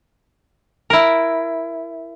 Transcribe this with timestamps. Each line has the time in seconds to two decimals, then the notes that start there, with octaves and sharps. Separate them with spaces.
0.90 E4 A#4